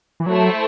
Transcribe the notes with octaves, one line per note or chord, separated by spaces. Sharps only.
E3
F#3 A3 E4 A4 C5